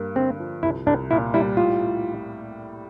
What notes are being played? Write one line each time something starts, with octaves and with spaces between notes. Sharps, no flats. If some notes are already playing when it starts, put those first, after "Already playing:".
Already playing: G2 A#3
D3 C4
F3
C2 E4
C2 D4
A#2 E4
G3 E4
A2 F4
A2